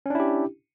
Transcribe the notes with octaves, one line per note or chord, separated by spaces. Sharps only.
C#4 D4 E4 G4